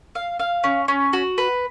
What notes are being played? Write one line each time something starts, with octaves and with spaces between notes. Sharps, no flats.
F5
F5
C#4
C#4
F#4
B4